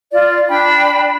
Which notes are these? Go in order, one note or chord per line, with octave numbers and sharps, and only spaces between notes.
F4 D5
D4 G5 B5